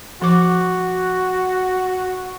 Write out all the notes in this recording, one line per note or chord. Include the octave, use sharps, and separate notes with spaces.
F3 F#4 D6